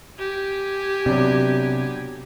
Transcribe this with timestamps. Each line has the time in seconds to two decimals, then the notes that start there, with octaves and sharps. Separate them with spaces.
0.19 G4 G#5
1.06 C3 F#3 B3 D4